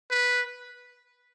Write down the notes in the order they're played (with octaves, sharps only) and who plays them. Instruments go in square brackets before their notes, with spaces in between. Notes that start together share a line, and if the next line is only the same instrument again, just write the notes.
[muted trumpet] B4